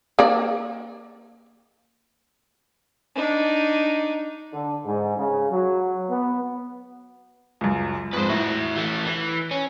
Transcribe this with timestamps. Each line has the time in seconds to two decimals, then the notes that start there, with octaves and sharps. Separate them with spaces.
0.19 A#3 D5
3.15 D4 D#4
4.53 D3
4.86 G#2
5.18 C#3
5.51 F#3
6.10 B3
7.61 C#2 F#2
8.13 F2 G#2 B4 C5
8.29 A2 F#4 E5
8.77 E3 A3
9.05 E3 B4
9.51 C#4